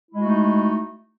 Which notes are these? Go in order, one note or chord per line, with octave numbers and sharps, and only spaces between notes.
G#3 A3 D#4 E4 F#4